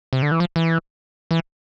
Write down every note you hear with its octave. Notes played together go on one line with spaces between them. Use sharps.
C3
D3
E3
F3
E3
E3